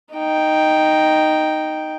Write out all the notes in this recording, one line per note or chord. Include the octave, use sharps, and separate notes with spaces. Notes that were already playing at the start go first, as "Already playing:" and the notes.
D#4 G5